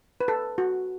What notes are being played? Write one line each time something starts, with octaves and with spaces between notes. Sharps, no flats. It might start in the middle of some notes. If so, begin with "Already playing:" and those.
B4
A4
F#4